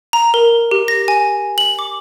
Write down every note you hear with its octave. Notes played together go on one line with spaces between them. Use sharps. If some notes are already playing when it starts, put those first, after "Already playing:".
A#5
A#4
G4
A#6
G#5
F#7
D6